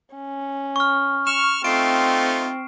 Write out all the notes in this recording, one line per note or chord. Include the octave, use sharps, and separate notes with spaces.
C#4
C#6 F6
C#6 F6 E7
A3 C4 D#4 F4 C7 D7